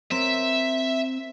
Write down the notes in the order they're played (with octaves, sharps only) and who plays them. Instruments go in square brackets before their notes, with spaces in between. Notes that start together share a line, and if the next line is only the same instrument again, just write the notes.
[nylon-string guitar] C4 A#4 C#5 [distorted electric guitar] E5